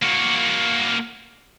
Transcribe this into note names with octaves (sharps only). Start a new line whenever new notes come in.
A#3 F#4